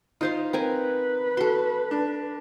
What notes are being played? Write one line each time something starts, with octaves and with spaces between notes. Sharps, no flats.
D#4 F4 C5 F5
C4 A#4 B4 G#5
F#4 A4 C6
D4